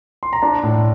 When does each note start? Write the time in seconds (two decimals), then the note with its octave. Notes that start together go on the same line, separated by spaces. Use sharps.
0.23 C6
0.33 A#5
0.42 D4 A5
0.64 A2